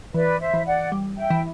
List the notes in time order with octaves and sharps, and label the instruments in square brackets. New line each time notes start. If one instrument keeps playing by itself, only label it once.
[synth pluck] E3 [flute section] B4 D5
[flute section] C5 E5
[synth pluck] E3
[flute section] D5 F#5
[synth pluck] G3
[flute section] E5 G5
[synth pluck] E3